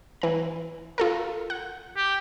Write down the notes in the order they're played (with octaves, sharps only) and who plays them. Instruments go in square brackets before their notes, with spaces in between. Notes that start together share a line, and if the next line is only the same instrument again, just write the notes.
[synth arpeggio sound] E3 A#5
F4 A4 A#4
F#5
[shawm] G4